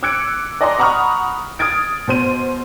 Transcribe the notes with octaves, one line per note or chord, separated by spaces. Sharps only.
D6 E6 F#6 G#6 C#7 D7
D5 D#5 G#5 A#5 C6 D6
F#5 A#5 B5 C#6 D#6 F6
D#6 F6 G#6 A6 D7
B2 C5 D#7